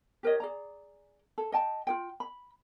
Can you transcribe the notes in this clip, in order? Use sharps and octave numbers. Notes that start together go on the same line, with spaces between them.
G4 A#4 C#5 D#5
G#4 D5 A#5
A4
D#5 G5 A5
F4 G#4 G5
B5